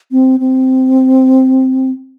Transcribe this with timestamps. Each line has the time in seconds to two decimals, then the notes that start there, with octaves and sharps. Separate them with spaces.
0.12 C4
0.40 C4